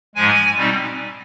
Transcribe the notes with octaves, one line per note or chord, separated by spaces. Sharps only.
G#2 F3 G#3 G#5
B2 G3 C4 D#4